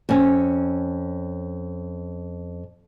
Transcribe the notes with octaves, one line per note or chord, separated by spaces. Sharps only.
F2 C#4